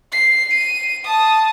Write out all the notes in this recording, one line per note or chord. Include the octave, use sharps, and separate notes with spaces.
C7
D#7
A5 D#6